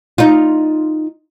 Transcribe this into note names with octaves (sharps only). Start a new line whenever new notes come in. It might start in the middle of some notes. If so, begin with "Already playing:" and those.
D#4 F4